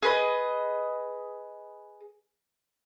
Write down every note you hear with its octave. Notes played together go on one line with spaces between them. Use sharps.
G#4 B4 D#5